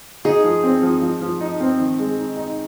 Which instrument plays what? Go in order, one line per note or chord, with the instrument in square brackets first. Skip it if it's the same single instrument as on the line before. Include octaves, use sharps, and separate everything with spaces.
[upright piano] D#4 [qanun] G#4
[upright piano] F3
C4
F3
F3
F3
D#4
C4
D#3
G#3
D#4
D#4